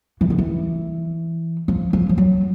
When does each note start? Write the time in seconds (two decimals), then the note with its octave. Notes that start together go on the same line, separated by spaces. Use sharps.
0.21 E3
0.30 D#3
0.38 E3
1.68 F3
1.93 F3
2.09 F3
2.18 F#3